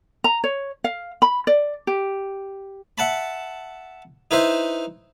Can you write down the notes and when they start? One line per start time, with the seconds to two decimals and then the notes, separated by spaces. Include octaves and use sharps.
0.24 A#5
0.44 C#5
0.84 F5
1.22 B5
1.47 D5
1.87 G4
2.98 E5 F#5 A5 B5
4.31 D#4 E4 B4 C5 E5